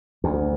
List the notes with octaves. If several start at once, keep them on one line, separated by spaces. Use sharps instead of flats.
D2